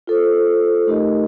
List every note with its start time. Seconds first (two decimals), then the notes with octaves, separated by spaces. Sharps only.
0.07 F4 A4 C5
0.87 A3 D#4 G4 A#4 D#5